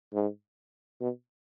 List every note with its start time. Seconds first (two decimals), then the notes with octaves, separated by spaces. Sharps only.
0.14 G#2
1.01 B2